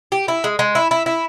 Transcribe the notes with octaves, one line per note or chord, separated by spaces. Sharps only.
G4
E4
G#3
G#3
E4
E4
E4